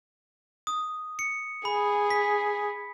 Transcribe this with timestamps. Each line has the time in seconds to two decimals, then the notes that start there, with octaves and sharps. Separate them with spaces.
0.67 D#6
1.19 C#7
1.65 G#4 B5
2.10 B6